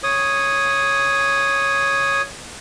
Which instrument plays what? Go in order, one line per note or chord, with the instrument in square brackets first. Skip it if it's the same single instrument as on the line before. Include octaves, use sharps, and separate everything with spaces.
[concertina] C#5 D#6